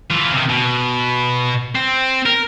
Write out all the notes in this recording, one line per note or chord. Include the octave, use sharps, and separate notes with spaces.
E3 F4
C3 D#3
B2
C4
A#4